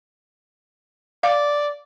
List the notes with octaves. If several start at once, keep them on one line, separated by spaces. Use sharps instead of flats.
D5 F5